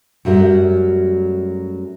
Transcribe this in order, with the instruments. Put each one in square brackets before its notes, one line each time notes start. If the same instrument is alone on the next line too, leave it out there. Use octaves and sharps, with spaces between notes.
[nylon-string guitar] F#2 F#3 G3 A3